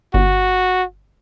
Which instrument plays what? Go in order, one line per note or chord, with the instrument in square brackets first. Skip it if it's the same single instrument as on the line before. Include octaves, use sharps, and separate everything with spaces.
[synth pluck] G1 [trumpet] F#4